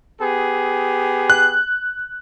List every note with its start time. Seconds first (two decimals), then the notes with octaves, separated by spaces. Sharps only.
0.21 B3 G4 G#4
1.30 F#6